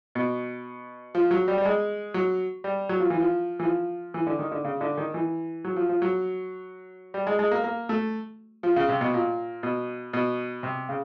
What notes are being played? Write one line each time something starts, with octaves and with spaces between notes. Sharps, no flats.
B2
F3
F#3
G3
G3
G#3
F#3
G3
F#3
F3
E3
F3
E3
F3
E3
D3
D#3
D3
C#3
D3
D#3
E3
F#3
F3
F3
F#3
G3
G#3
G#3
A#3
A#3
A3
F3
C#3
C3
B2
A#2
B2
B2
C3
C#3